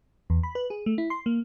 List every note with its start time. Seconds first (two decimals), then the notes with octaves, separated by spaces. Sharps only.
0.30 E2
0.43 B5
0.55 B4
0.70 G#4
0.86 A3
0.98 E4
1.10 C6
1.26 A#3